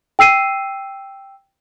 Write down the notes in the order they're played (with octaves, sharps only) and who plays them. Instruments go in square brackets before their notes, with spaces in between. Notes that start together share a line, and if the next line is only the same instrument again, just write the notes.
[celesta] G5 E6 C7 D#7